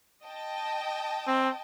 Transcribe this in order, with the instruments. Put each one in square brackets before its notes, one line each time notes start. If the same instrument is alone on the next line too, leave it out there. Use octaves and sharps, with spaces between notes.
[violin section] D#5 G5 A5
[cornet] C4